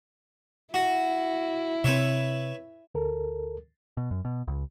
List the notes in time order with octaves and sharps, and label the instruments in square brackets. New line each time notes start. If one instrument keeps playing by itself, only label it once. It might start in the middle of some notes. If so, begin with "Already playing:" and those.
[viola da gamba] E4 [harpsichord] F#4
[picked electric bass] C3 C4 [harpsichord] B4 C#5 E5
[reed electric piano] D2 A4 A#4
[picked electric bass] B2
F#2
B2
C#2